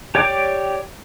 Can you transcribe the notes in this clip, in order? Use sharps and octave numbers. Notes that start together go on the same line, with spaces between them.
G4 C#5 D5 G5 D6